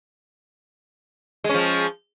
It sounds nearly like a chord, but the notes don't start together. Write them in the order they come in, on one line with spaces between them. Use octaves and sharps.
G#3 C#4 F3